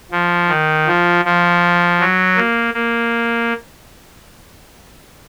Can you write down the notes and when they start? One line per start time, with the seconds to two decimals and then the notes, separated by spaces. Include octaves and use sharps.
0.11 F3
0.49 D#3
0.87 F3
1.25 F3
2.00 F#3
2.37 A#3
2.74 A#3